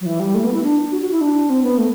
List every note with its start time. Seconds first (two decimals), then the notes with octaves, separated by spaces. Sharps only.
0.01 F#3
0.06 E3
0.20 G3
0.35 A3
0.44 B3
0.54 E4
0.63 D4
0.92 F#4
1.02 F#4
1.11 E4
1.21 D4
1.50 C4
1.63 B3
1.78 A3